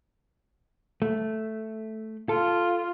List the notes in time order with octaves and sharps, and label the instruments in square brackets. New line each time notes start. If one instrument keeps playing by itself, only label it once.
[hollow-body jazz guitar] A3
[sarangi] F4 [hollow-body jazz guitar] A4